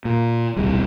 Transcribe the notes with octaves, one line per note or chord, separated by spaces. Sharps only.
A#2
D1 B1 C3 G3